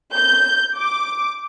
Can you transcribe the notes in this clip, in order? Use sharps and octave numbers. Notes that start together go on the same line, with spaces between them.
G6
D6